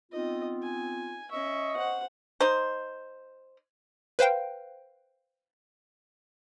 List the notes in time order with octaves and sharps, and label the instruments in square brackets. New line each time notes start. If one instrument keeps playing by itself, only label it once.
[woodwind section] B3 C4 F4 [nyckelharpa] D#4 D#5
[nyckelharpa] G#5
[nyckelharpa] C#4 E5 [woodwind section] D#5 C#6
[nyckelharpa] C5 F#5
[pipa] D#4 C5
[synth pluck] B4 C5 F5 G5